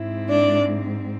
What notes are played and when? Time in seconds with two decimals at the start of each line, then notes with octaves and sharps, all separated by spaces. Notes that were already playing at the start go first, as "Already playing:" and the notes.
Already playing: G#2 G#3 C4 E4
0.29 D4 D5